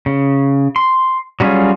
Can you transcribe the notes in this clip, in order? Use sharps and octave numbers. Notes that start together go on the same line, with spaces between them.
C#3
C6
F#3 G3 C#4 F4 G#4